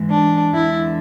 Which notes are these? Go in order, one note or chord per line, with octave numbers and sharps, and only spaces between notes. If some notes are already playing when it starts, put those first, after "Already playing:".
Already playing: G#2 E3 G#3
D4
E2 D3 G#3 E4